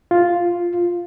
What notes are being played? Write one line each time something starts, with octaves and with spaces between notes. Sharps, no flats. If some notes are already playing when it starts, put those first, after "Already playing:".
F4